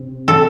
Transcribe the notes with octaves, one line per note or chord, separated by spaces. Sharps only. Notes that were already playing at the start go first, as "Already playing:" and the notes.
Already playing: C3
A4